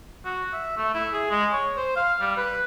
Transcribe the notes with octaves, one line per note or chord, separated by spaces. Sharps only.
F#4
E5
A3
E4
G#4
G#3
C#5
C5
F5
G3
B4